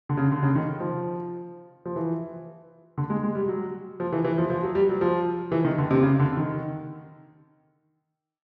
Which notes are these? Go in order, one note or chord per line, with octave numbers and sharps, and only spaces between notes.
D3
C#3
D3
C#3
D#3
F3
F3
E3
D3
G#3
G#3
G3
F#3
F3
E3
E3
F3
F3
F#3
G3
F#3
F3
E3
D#3
D3
C3
C#3
D3
D#3